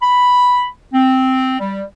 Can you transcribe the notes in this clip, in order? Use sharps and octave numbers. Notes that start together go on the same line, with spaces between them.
B5
C4
G3